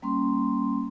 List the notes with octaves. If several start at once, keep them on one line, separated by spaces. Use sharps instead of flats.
G3 A#3 C#4 C6